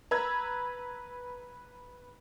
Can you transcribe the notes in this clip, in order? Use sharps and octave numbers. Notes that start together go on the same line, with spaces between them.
B4 A#5 B5 E6 G#6